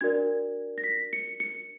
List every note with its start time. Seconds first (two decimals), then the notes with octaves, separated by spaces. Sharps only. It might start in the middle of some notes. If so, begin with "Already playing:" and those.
0.01 D4 F#4 A#4 D5 G#6
0.78 A#6
0.84 B6
1.13 C#7
1.40 C#7